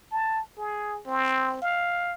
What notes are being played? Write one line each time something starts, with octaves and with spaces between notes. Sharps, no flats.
A5
G#4
C4
F5